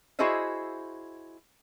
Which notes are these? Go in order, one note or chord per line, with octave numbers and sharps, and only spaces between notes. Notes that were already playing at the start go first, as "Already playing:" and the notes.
E4 F#4 G#4 C5 D#5 E5